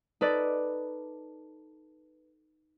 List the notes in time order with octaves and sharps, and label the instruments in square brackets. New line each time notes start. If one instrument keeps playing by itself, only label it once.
[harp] D#4 A4 B4 D5